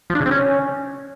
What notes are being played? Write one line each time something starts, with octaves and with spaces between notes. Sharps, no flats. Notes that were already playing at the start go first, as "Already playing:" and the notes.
F3
D4
C#3
C4
C#4